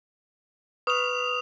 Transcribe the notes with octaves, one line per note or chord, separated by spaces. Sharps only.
B4 C#6 D#6 F6 F7